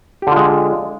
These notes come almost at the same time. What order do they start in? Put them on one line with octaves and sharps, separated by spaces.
G4 D3 F4 G#3